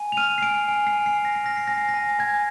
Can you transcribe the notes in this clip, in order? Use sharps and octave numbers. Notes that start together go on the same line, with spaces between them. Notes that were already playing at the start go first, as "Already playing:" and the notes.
Already playing: G#5
F7
F6 D#7
C7
G#5 D7
G#5
C7
G#5
C7
G#5
A#6
C7
F6 A#6
C7
G#5 A#6
C7
A#6
G#5
G#5 G#6